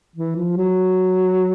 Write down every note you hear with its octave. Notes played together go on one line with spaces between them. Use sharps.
E3
F3
F#3